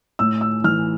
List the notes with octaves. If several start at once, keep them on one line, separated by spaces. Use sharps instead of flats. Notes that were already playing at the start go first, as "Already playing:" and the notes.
A2 E6
E6
E3 F6